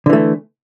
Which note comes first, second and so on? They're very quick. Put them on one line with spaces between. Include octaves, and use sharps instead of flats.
D3 E3 A3